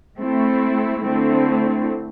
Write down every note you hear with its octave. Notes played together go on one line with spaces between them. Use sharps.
A3 C4 E4
D3 A3 C4 E4